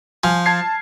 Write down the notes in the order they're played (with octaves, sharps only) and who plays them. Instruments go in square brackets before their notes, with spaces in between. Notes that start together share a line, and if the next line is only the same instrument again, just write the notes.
[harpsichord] F3 [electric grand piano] G#5 F6
[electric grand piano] A5 G#6 C7